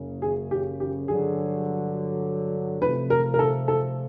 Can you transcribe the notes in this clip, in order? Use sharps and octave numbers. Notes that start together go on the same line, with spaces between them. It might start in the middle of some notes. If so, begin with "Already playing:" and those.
Already playing: F#1 F#2 C#3
G#4
G4
G4
G2 D3 F#3 G#4
C3 F3 A3 B4
A#4
A#4
A4
A4